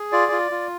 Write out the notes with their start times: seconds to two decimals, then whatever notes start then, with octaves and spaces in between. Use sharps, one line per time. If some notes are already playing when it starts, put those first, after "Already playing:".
Already playing: G#4
0.12 F4 D5
0.32 F4
0.51 F4